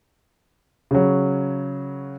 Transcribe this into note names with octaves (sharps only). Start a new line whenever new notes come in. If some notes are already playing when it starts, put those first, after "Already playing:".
C#3 F#3